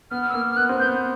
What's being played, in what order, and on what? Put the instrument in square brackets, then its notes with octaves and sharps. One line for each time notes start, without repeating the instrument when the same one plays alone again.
[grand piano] B3 [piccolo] F6
[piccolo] E6
[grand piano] A#3 [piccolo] F6
[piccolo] F6
[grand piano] B3 [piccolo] F#6
[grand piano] C4
[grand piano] B3 [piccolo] G6